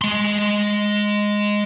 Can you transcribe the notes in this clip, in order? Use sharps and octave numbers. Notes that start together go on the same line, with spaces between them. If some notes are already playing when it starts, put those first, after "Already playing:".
G#3 C6